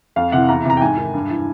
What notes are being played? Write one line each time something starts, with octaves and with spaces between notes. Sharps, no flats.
F2 F5
C3 E3 F#5
E2 A#5
C3 E3 A#5
G5
G#2 G#5
D#3
G2
E3